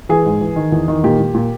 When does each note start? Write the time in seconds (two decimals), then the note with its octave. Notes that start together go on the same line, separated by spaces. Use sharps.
0.09 E3 G#4
0.25 G#2
0.41 E3
0.56 D#3
0.72 E2
0.88 D#3
1.04 A#2 G4
1.19 A#2
1.35 A#2